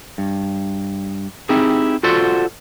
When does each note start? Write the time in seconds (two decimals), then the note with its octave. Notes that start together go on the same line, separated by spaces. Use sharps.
0.18 G2
1.49 C4 D#4 E4 G4 G#4
2.03 F4 F#4 A4 C5 D5 F#5